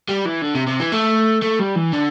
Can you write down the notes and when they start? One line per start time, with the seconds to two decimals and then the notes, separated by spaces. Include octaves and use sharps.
0.08 G3
0.25 E3
0.42 D3
0.55 C3
0.67 C3
0.80 E3
0.92 A3
1.42 A3
1.60 G3
1.76 E3
1.93 D3